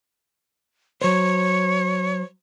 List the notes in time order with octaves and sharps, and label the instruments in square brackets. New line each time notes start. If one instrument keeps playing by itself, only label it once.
[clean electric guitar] F#3 C5 [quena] C#5